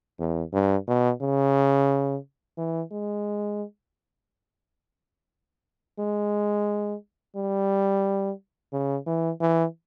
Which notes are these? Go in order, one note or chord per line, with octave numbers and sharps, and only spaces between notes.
E2
G2
B2
C#3
E3
G#3
G#3
G3
C#3
E3
E3